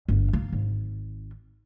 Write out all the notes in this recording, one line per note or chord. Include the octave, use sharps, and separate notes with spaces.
G1
A#3
G#1